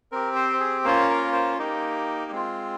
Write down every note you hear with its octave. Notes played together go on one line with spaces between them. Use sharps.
C4 G4 A#4
C5
G#4
A#3 C#4 F4 C5
A#4
C5
A#3 D#4 G4
G#3 C4 F4